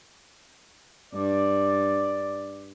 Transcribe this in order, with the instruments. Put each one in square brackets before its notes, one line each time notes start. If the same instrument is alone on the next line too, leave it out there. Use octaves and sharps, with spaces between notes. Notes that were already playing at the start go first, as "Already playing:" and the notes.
[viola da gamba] G2 [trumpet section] D5